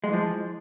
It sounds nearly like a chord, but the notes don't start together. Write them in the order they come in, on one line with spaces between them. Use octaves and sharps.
G#3 E3 F3